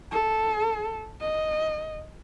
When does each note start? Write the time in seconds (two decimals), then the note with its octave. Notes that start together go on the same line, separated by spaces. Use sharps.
0.11 A4
1.21 D#5